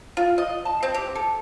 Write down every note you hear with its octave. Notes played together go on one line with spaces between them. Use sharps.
F4
D#5
A5
C4
G4
A4